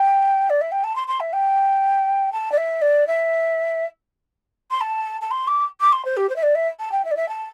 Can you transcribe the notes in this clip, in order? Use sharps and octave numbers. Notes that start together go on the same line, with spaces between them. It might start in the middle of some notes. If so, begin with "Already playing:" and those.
Already playing: G5
D5
E5
G5
A5
C6
C6
E5
G5
A5
D5
E5
D5
E5
C6
A5
A5
C6
D6
D6
C6
C5
G4
C5
E5
D5
E5
A5
G5
E5
D5
E5
A5